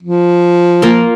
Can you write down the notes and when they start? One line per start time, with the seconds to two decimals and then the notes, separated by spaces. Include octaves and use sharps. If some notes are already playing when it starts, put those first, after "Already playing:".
0.02 F3
0.82 A#3 F4